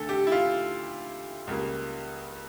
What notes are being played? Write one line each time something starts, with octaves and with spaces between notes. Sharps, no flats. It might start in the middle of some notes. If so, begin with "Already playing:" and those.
Already playing: D2 D3 A3 A4
G4
E4
F4
C#2 C#3 G3 A#3